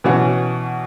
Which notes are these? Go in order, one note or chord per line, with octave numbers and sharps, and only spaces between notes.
B2 E3 C#4 F#5